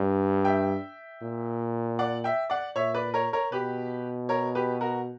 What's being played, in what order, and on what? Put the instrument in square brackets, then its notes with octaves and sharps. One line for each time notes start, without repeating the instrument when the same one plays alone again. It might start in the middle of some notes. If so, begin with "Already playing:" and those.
Already playing: [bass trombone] G2
[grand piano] E5 G5
[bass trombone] A#2
[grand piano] D5 F#5
E5 G5
D5 F#5
[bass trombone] A#2 [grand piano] C#5 E5
[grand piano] B4 D5
A#4 C#5
A#4 C#5
[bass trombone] B2 [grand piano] G4 B4
[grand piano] A#4 C#5
G4 B4
F#4 A#4